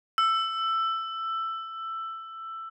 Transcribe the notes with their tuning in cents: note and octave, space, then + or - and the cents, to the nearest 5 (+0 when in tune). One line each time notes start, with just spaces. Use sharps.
E6 +15